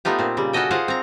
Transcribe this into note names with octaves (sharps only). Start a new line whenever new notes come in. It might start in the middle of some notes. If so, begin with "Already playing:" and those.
A3 B3 D#4 F4 G4
A#2 C4
C#3 G3
C#4 F#4 G4 A4 D#5 G5
F4 G#4 C5 F5 F#5
C4 A#5